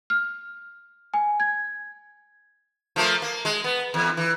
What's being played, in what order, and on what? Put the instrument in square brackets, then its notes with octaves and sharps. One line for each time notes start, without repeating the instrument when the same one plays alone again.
[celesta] F6
G#5
G#6
[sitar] F3 A3 A#3
A#3
G#3
B3
E2
E3